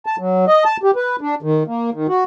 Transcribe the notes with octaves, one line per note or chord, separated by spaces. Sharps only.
A5
F#3
D#5
A5
G4
B4
D4
D#3
A#3
D#3
F#4